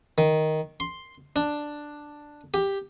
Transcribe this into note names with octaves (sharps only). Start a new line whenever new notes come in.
D#3
C6
D4
G4